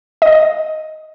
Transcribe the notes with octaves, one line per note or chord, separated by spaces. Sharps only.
D#5